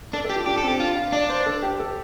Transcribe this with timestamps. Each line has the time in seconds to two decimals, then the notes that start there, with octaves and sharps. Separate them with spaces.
0.13 D4 A4
0.25 A4
0.30 G4
0.36 F4
0.46 D4 G4
0.58 A4
0.63 C4
0.68 G4
0.80 D4 F4
0.96 F5
1.12 D4 D5
1.29 C5
1.46 A4
1.63 G4
1.80 A4